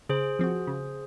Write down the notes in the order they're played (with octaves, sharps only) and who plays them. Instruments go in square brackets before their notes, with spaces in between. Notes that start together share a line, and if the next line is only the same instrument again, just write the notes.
[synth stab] C#3 [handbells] G#4 C5
[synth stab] F3 C4 F#4
C#3